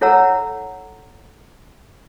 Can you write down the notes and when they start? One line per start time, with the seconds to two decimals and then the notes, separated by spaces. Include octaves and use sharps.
0.01 E4 A4 C#5 F#5 A#5 E6